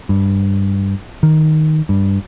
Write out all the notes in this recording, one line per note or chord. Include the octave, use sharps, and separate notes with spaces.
G2
D#3
G2